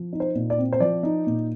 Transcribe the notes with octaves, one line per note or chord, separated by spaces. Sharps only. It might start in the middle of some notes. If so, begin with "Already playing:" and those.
Already playing: F3
D#4
C5
A#2
D5
C4
C5
F3 D5
D#4
A#2